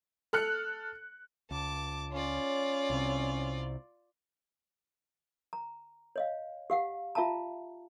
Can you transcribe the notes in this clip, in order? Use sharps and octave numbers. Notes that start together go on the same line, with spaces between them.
A4 F6 F#6 C#7
C#2 A5 D6
C#4 F4 C#5 D5
C2 C3
A#5
C#5 D#5 F5
G4 F5 F#5
F4 E5 F5 A5 A#5